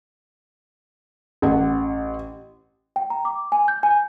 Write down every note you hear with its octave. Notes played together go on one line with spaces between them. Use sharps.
A1 F#5
G5
A#5
D6
G#5
G6
G#5